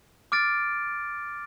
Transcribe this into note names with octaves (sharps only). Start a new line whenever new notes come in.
D6 F6 A6 D7